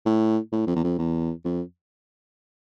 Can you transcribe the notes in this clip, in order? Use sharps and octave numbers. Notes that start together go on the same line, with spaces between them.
A2
A2
F2
E2
F2
E2
F2